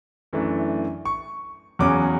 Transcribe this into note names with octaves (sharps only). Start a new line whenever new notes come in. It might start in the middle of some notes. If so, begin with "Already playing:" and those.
F#2 E3 A3 D4
C#6
E2 C#3 F#3 C#4 D6